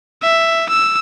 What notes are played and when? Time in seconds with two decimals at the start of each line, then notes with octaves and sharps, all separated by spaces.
0.22 E5
0.69 E6